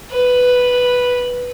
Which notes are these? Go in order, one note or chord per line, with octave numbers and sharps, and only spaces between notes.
B4